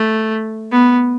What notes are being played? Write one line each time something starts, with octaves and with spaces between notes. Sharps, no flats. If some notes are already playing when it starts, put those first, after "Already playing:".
Already playing: A3
B3